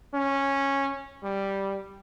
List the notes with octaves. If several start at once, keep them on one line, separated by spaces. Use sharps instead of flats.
C#4
G3